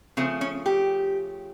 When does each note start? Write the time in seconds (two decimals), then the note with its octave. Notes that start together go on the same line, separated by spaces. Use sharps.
0.17 C#3 F3 A3 C4
0.41 C#4
0.66 G4